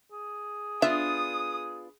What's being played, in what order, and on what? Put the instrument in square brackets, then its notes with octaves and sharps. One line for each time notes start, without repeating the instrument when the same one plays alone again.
[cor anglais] G#4
[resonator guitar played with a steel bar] B3 D4 F4 [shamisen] E5 [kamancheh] D#6